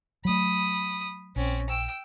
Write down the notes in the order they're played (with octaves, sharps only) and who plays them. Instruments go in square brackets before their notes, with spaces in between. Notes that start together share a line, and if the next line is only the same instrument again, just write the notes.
[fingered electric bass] F#3 A3 [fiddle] B5 D#6
[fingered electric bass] A#1 [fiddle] C4 C#4
[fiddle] G5 E6